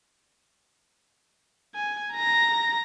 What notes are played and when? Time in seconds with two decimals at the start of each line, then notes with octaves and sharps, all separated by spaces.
1.75 G#5
2.14 A#5 A#6